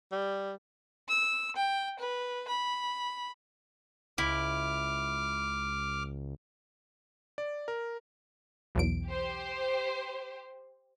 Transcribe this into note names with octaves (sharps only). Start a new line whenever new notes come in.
G3
E6
G5
B4
B5
C#2 E4 D6 F6
D5
A#4
B1 E2 D7
G4 C5